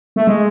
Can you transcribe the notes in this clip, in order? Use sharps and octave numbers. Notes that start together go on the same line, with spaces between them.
A3
G#3